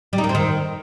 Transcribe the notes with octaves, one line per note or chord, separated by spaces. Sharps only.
G3
D#4
A#3
C4
D#3